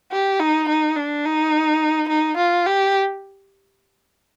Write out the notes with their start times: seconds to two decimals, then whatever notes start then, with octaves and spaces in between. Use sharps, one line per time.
0.12 G4
0.40 D#4
0.69 D#4
0.96 D4
1.26 D#4
2.09 D#4
2.38 F4
2.66 G4